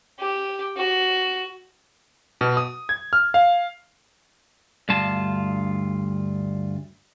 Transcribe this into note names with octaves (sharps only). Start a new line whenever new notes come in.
G4
F#4
B2
D#6
G#6
F6
F5
D2 G2 F4 A5